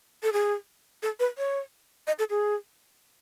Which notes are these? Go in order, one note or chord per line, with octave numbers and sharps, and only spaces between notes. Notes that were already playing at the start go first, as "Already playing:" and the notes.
A4
G#4
A4
B4
C#5
D#5
A4
G#4